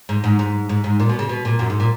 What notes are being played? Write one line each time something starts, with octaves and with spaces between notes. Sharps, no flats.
G#2
G#2
G#2
G#2
G#2
A#2
B2
C#3
B2
A#2
F#2
G#2
A#2